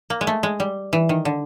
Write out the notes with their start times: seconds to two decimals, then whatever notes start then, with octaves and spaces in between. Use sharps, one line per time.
0.10 A#3
0.21 G#3
0.27 A3
0.43 G#3
0.60 G3
0.93 E3
1.09 D#3
1.25 D3